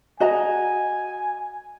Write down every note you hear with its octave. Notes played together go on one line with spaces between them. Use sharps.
F#4 D#5 G#5 A#5